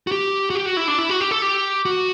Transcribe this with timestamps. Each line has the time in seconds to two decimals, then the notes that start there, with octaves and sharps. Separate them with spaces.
0.07 F#4
0.12 G4
0.50 F#4
0.55 G4
0.66 F#4
0.77 E4
0.88 D4
0.98 E4
1.09 F#4
1.21 G4
1.31 A4
1.42 G4
1.85 F#4